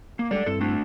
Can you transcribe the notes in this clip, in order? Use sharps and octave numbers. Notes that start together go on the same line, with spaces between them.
A#3
G3 G#3 G4 A4 D5
G2 C4 E4 A4
A3 D4